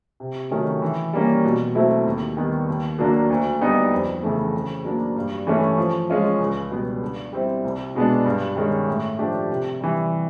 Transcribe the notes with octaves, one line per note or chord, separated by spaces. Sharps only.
C3
D#3 F#3 A3 C#4
E3
G3 A#3 C#4
B2
F#3 A3 C4 E4
D#2
D#3 G3 B3
D#2
D3 F#3 A#3 D4
D2
D3 G3 B3 D#4
F2
C#3 E3 A3
C#3
F#3 A#3 D4
G2
E3 A3 C#4
F3
G#3 C#4 F4
C#2
B2 G3 B3
D3
G3 C4 E4
C2
B2 G#3 B3 D4
G2
D#3 G#3 C#4
A2
F3 A3 D4 G4
C3
E3 G3